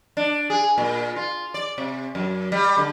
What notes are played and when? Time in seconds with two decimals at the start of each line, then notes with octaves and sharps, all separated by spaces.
0.17 D4
0.50 G#4
0.78 A#2
1.16 F4
1.54 D5
1.78 C3
2.15 F#2
2.52 G3
2.78 D3